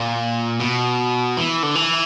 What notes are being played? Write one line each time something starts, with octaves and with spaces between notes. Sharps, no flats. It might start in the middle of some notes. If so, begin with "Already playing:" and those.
Already playing: A#2
B2
E3
D3
E3